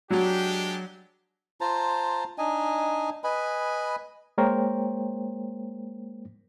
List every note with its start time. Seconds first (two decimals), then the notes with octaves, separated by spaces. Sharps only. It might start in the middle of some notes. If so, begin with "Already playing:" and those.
0.11 F#3 G#3 D4 G4
1.61 F4 C5 A5 A#5
2.38 D4 D#4 D#5 G#5
3.24 B4 D#5 G#5 B5
4.38 G#3 A#3 A#4 C5 C#5 G5